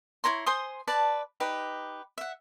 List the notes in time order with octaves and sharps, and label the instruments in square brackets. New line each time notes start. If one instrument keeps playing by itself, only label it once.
[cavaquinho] E4 C#5 A#5 C6
C5 G#5 C6 D#6
B4 D5 A5
D#4 G4 B4
E5 F#5